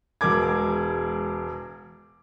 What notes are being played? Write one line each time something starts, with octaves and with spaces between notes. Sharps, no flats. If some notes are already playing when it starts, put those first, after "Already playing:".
E1 G#3 A#4 D6 G#6